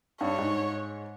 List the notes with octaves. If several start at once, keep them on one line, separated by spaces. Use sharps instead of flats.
G2 C#5
G#2